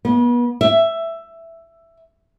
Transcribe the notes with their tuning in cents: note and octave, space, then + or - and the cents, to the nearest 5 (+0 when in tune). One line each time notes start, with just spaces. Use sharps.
B3 -35
E5 +10